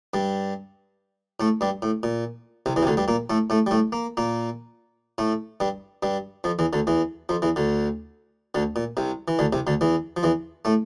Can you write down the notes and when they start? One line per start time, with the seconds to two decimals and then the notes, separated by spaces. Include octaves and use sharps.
0.14 G2 G3
1.40 A2 A3
1.61 G2 G3
1.82 A2
2.03 A#2
2.66 C2 C3
2.76 E2 E3
2.83 C3
2.87 D2 D3
2.97 G2 G3
3.08 A#2 A#3
3.30 A2 A3
3.50 A2 A3
3.67 G3
3.71 A2 A3
3.92 A#3
4.17 A#2 A#3
5.18 A2 A3
5.60 G2 G3
6.03 G2 G3
6.44 F2 F3
6.59 E2 E3
6.73 D2 D3
6.87 E2 E3
7.29 F2 F3
7.42 E2 E3
7.56 D2 D3
8.55 D2 D3
8.76 A#2
8.97 C2 C3
9.28 E3
9.39 D2 D3
9.53 C2 C3
9.67 D2 D3
9.81 E2 E3
10.17 F3
10.23 E2 E3
10.65 A2 A3